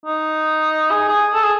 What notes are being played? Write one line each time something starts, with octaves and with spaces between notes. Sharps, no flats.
D#4
G#4
G#4
A4
G#4